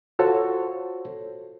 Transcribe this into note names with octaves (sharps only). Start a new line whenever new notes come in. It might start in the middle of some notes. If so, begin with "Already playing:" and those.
F4 F#4 A4 C5 C#5